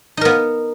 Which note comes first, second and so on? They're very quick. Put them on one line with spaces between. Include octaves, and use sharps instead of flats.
D#4 A#4 B3